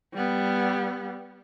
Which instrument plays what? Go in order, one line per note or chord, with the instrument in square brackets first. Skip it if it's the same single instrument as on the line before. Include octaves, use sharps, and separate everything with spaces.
[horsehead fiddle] G3 B3